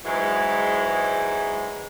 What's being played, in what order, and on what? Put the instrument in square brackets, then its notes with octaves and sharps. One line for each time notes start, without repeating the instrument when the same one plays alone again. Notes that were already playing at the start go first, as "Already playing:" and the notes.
[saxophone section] G#2 E3 F#3 G#3